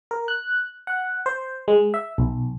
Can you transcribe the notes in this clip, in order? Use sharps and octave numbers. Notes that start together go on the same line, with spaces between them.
A#4
F#6
F#5
C5
G#3
E5
B1